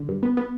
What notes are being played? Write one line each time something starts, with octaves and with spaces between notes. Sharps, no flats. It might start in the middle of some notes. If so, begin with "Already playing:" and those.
Already playing: D3
G2
B3
B3